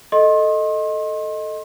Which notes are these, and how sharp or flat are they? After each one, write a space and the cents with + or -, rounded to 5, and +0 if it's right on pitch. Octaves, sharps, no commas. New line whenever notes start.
A4 +0 D#5 +0 C6 +35